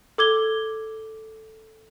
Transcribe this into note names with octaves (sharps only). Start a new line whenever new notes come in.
A4 D6 G#6 G7